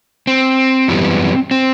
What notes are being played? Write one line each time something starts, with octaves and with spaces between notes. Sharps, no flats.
C4
F#2 E3 G3 B3
C4